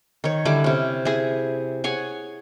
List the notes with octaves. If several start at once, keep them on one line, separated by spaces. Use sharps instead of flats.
D#3 C#5
D3 G3 E4 D6
C3 C#4
E4 G#4
G#4 C#5 F#5 G#5